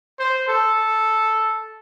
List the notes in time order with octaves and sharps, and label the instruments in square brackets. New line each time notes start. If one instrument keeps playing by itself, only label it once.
[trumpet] C5
A4